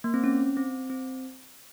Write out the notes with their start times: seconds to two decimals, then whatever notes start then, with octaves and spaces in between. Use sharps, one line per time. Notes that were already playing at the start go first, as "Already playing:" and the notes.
0.04 A#3
0.14 C4
0.24 C#4
0.57 C4
0.90 C4